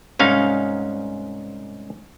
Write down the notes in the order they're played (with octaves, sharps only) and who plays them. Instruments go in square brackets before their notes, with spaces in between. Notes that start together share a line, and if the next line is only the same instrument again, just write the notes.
[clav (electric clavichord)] C2 G#2 C#4 D#4 F5